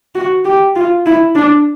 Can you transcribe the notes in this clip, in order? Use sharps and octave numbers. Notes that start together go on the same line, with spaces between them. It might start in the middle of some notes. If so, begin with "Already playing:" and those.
F#4
G4
F4
E4
D4